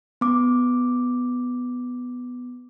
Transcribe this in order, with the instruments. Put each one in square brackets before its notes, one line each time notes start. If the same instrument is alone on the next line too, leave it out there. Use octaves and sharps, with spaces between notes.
[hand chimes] B3 D6